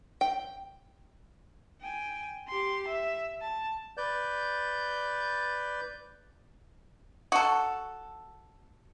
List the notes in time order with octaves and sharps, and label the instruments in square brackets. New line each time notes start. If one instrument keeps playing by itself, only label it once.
[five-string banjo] G5
[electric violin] G5 G#5
G4 C6
E5
A5
[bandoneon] B4 D5 G6
[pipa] F#4 A4